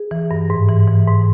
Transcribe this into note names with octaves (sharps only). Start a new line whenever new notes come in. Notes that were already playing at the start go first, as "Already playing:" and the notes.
Already playing: G#4
E3
G2
G#2
E3
E3
G#2